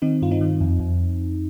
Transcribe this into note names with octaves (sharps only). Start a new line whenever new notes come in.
D#3 C4 D#4
G2 F4
C4 D#4
D#3
F2
F2